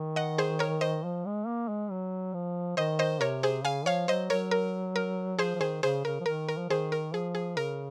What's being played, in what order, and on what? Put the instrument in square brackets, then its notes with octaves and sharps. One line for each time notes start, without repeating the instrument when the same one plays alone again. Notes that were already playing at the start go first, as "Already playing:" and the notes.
Already playing: [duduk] D#3
[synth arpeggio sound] D#5 F#5
G#4 C5
A#4 C#5
C5 D#5
[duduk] F3
G#3
A#3
G#3
F#3
F3
[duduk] D#3 [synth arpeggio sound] C5 D#5
[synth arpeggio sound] C5 D#5
[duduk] C3 [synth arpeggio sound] A#4 C#5
[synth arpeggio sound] G#4 C5
[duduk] C#3 [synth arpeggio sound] F5 G#5
[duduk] F3 [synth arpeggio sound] C#5 F5
[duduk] F#3 [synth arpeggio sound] C5 D#5
[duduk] F#3 [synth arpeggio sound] A#4 C#5
[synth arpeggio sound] A#4
A#4
[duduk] F3 [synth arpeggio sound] G#4 C5
[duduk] F3
[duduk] D#3 [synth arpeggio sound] G#4 C5
[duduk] C#3 [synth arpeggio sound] G#4 C5
[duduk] C#3 [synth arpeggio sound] A#4
[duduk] F3
[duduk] D#3 [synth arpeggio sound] A#4
[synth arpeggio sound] A#4
[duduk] F3
[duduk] D#3 [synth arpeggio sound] G#4 C5
[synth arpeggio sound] A#4
[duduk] F3 [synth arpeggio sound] G#4
[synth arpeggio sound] G#4
[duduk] C#3 [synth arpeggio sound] A#4